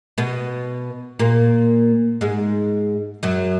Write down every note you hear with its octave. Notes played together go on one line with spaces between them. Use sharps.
B2 B3
A#2 A#3
G#2 G#3
F#2 F#3